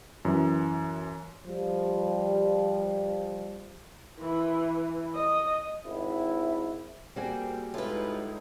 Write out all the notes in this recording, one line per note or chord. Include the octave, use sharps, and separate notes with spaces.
F#2 E3
F3 G3
E3
D#5
G#1 E4
G3 A#3 C4 F#4 G#4
A2 G#3 D#4 F4 B4